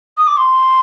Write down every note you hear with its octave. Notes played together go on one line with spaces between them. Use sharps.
D#6
D6
C6